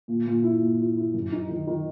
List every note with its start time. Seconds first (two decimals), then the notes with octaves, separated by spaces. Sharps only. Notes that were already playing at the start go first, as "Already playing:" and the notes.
0.08 A#2
0.26 A#2
0.44 E4
0.61 A#2
0.79 E4
0.97 E4
1.14 F#2
1.32 D#4
1.49 D#3
1.67 D#3